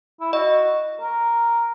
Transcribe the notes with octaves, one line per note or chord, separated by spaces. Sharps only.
E4
F#4 D#5
A#4